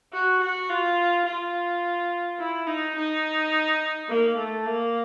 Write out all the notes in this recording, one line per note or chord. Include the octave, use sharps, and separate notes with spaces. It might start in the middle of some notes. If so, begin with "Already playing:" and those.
F#4
F#4
F4
F4
E4
D#4
D#4
A#3
A3
A#3